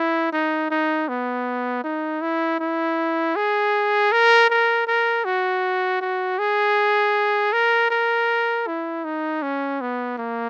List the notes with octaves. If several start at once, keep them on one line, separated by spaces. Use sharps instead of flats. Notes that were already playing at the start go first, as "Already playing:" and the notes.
Already playing: E4
D#4
D#4
B3
D#4
E4
E4
G#4
A#4
A#4
A#4
F#4
F#4
G#4
A#4
A#4
E4
D#4
C#4
B3
A#3